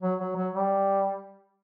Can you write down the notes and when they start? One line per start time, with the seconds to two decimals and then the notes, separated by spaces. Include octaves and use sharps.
0.02 F#3
0.20 F#3
0.36 F#3
0.54 G3